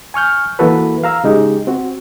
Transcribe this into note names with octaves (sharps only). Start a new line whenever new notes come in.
G#5 C#6 F6 G6
E3 A#3 F#4 A4 B4
F5 A#5 E6
C#3 G#3 D#4 G4
C4 F#4